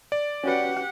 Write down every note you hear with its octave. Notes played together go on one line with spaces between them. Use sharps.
D5
C#4 F#4 G4 B4 F#5